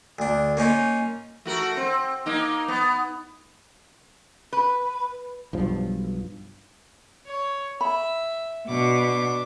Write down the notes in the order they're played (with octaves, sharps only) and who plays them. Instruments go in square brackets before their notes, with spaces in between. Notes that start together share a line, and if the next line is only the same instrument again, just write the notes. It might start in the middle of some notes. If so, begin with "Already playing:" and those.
[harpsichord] D2 D4
A#3 C#4 D#4 F4
[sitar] A3 F#4 A#4
C4
A#3 D#4
B3
[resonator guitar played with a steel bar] B4
[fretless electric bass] B1 G2 F3
[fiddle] C#5
[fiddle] E5 [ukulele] B5
[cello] B2 [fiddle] D4 D6